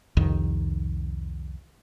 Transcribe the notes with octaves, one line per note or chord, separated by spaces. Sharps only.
C2 F2 D#3